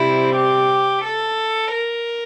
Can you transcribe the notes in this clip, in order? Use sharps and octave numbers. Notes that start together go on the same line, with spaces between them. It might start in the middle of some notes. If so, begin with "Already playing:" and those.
Already playing: C3 G3 C4 E4
G4
A4
A#4